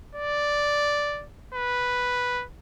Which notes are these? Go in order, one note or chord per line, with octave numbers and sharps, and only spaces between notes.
D5
B4